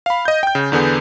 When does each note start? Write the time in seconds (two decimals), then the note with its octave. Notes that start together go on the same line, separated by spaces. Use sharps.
0.06 F5 B5
0.25 D#5 G6
0.43 G5 G6
0.55 C#3
0.72 E2 D3 B3 G#4 G6